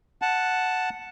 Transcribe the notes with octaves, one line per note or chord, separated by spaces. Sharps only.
F#5 A5